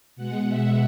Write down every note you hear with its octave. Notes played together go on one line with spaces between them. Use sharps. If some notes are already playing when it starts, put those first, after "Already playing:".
B2 G#3 F#5
E5